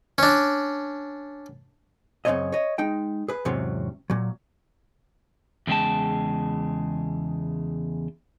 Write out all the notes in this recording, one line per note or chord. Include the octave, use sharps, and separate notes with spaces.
C#4 D4
F#2 C#3 A3 C4 C#5 D#5
C#5 D#5
G#3 D#4 G5
G#4 B4
E2 G#2 C3 F#3 C4 C#4
A#2 F#3
E2 C#3 G#3 G5 A5